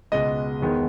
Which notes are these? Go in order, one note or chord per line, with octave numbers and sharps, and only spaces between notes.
C#2 B2 G#3 B3 D#5
E1 E2 D#3 G#3 B3